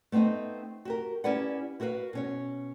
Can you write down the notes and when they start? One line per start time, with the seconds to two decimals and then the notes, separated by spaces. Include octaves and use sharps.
0.12 A3 B3 C4 D#4 D#5
0.85 F#4 G4 A#4
1.24 C#4 E4 G4 B4 D5 F#5
1.80 E4 F#4 A#4 B4 F5
2.13 B2 C#4 C#5